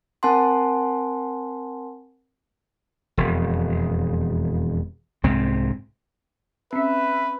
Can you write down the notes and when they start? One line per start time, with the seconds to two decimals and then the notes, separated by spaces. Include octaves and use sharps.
0.23 C4 A#4 F#5 G#5 A5 C6
3.17 E1 F2
5.23 C2 G#2 C4
6.73 C4 C#4 B4 E5